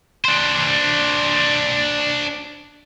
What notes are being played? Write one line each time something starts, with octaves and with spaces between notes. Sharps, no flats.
D4 C5